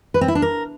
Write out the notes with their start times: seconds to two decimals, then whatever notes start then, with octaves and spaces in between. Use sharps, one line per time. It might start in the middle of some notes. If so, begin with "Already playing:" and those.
0.14 B4
0.21 C4
0.28 E4
0.35 D4
0.42 A#4